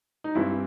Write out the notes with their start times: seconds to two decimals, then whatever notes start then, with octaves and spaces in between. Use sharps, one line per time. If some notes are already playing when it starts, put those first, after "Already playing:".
0.24 D#4
0.35 G2 E3 G3 C4 E4